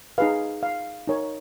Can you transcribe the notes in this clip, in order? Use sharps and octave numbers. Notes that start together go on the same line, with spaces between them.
D#4 G#4 B4 F5
F5
D#4 A#4 C#5